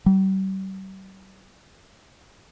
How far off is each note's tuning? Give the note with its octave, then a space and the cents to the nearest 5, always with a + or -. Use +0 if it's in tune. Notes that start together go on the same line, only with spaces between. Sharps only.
G3 -40